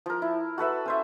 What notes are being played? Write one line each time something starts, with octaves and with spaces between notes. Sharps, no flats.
F3 A#4
E4
F#4 A4 B4 E5
C#4 C5 E5